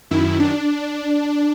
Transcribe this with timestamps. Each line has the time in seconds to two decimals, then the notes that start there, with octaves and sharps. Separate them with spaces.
0.11 F#2 D#3 E4
0.40 D4